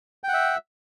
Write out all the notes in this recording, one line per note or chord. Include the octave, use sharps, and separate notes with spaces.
E5 F#5 G5